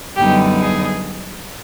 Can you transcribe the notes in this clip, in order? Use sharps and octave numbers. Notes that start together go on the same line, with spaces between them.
F#2 D3 G3 B3 D#4 G4
G#4